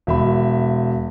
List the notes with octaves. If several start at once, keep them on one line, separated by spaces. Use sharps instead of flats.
E1 E5 B5